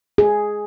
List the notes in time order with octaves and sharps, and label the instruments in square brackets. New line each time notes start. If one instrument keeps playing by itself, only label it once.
[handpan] G#4